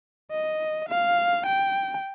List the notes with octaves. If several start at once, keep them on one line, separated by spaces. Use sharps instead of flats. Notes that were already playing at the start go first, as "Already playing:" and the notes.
D#5
F5
G5